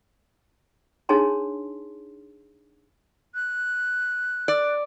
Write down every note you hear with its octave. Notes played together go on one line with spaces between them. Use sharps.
D4 D#4 G#4 C#5 A5 C6
F#6
D5